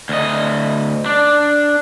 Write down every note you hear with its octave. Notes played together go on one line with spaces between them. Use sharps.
D2 D#5
D4